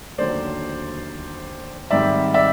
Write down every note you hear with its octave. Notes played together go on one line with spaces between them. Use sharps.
D#2 D3 F#3 A3 C5 D5
G#2 D#3 G3 C4 D5 E5
D5 E5